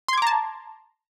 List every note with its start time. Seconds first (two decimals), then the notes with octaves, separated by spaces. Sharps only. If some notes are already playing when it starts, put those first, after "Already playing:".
0.08 C6
0.13 G#6
0.18 D6
0.22 A#5
0.27 A5